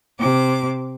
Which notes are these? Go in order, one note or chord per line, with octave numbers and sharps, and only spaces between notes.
C3 D6